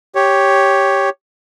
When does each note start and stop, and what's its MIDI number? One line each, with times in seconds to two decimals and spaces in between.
0.15 1.09 67
0.15 1.09 73